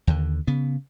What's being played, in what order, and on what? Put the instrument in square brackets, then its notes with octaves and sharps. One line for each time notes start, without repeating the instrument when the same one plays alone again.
[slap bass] D#2 D3
C#3 B3